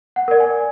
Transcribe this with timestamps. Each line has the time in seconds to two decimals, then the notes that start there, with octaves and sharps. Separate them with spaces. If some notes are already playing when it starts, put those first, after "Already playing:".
0.16 F#5
0.28 A#4 D5
0.40 G#5